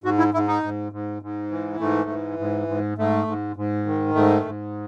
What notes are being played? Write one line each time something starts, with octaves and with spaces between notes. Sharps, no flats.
G#2 F#4
E4
G#2 E4
D#4
G#2
G#2
G#2
E3
G#2 A3
E3
G#2
G#2
G#2 A3
G#2
G#2
D#3
G#2 A3
G#2